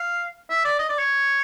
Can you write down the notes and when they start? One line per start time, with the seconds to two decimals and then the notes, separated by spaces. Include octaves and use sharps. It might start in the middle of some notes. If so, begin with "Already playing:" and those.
Already playing: F5
0.50 E5
0.65 D5
0.79 D#5
0.89 D5
0.99 C#5